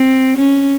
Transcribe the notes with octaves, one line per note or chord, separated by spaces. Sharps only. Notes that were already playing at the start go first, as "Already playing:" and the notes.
Already playing: C4
C#4